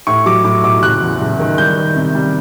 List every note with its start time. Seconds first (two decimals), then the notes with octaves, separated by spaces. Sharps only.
0.07 A2 C#6
0.26 F#3 D6
0.44 A2 D6
0.63 B1 D6
0.83 F#1 F#6
1.01 E2
1.21 F#1
1.39 D#3
1.58 G3 G6
1.77 D#3
1.96 C3
2.15 G3